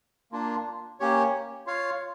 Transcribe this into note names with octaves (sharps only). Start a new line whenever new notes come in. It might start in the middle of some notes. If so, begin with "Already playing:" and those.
A#3 D4 F4
A#3 C#4 G4 C#5
F4 C#5 F5